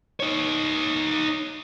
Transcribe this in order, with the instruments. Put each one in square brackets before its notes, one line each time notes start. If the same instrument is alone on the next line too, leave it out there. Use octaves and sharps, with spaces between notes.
[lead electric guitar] D#4 C#5